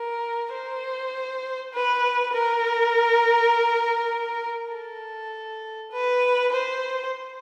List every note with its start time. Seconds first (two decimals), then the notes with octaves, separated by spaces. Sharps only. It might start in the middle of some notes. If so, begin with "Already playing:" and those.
Already playing: A#4
0.54 C5
1.73 B4
2.34 A#4
4.73 A4
5.92 B4
6.52 C5